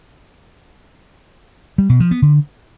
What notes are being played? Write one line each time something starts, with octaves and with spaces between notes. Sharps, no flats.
G3
B2
F3
B3
D3